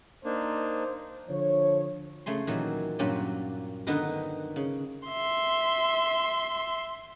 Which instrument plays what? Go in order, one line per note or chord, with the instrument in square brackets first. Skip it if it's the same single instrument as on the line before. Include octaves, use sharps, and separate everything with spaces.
[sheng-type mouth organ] A#3 D4 D#4 [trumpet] C5
[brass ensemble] D3 F3 C#5
[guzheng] C#3 A3 G#5 C6
A#2 D#3 E3 F#3
G2 A#2 F#3 C#4 F4 G4
D3 D#3 B3 D#4 A#4 B4
C#3
[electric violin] E5 C6